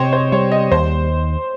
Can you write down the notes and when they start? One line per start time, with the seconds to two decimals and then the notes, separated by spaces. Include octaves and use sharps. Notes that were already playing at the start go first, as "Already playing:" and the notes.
Already playing: C3 C5 C#5 D#5 G5
0.13 C5
0.32 G3 C#5
0.52 D#5
0.71 D#2 C5